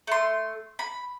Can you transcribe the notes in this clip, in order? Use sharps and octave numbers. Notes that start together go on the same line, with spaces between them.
A3 C6
B5